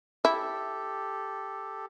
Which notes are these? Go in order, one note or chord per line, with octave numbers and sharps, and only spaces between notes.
E4 G4 A4